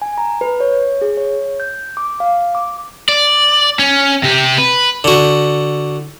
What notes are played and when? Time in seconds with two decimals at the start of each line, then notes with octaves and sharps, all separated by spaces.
0.02 G#5
0.18 A#5
0.41 B4
0.60 C#5
1.02 G#4
1.17 C#5
1.60 G6
1.97 D6
2.20 F5
2.55 D6
3.09 D5
3.79 C#4
4.23 C3 G4
4.58 B4
5.04 D3 F#4